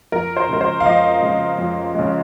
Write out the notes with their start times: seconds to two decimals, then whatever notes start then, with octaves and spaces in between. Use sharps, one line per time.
0.12 F2 A#4
0.37 C5
0.49 C#3 G#3 A#4
0.61 C5
0.80 F5
0.85 F2 D#5
1.22 C#3 G#3
1.58 F2
1.95 C#3 G#3